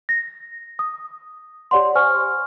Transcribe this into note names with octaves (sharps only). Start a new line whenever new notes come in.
A#6
D#6
G4 C#5 D5 F#5 C6
C5 G#5 C#6 F6